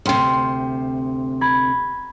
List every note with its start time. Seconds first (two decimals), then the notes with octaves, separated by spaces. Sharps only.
0.06 D2 C3 G5 C6 F6
1.41 A#5 B5 G#6